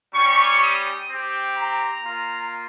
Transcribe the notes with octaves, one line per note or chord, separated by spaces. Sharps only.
G3 C#4 G4 C#6
D#6
C4 G4
A#5
A#3 F4